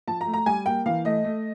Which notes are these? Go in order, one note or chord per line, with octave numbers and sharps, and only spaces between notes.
F3 A5
A#5
A3
A#5
G3 G#5
A#3 G5
E3 F5
A3 D#5
A3